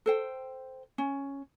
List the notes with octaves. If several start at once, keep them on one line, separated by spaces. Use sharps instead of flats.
A4 C5 G5
C#4